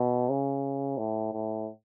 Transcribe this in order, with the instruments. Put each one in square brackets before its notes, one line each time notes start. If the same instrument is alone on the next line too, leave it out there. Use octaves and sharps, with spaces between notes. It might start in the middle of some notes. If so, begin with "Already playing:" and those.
Already playing: [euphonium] B2
C#3
A2
A2